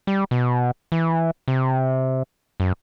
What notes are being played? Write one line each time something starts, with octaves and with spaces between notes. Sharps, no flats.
G3
B2
E3
C3
F#2